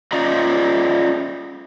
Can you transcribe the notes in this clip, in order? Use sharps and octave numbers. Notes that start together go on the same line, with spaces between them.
C#4 F4 D5 D#5 A#5